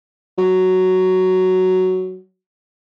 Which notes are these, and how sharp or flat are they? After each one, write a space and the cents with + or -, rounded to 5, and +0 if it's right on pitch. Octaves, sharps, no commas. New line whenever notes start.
F#3 +5